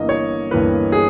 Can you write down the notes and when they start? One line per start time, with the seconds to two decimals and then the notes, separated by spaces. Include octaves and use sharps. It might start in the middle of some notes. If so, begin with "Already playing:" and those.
Already playing: G1 G2 E3 A#3 D#5
0.09 C#5
0.51 G1 G2 E3 A#3 B4
0.92 G#4